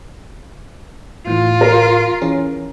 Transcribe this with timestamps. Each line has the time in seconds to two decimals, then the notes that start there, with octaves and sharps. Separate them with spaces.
1.27 A2 E3 F4
1.61 A#4
2.21 E3 C#4 G#4